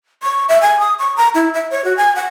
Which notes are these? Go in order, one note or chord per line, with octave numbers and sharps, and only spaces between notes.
C#6
E5
G#5
D#6
C#6
A#5
E4
E5
C#5
F#4
G#5
F#5